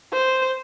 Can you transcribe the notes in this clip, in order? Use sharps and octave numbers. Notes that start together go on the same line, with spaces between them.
C5